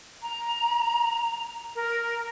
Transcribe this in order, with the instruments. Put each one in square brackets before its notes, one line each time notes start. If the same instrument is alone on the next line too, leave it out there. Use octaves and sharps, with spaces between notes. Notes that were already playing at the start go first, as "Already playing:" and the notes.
[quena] A#5
A#4